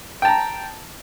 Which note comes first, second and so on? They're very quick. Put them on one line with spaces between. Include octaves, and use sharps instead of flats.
G5 A5 A#5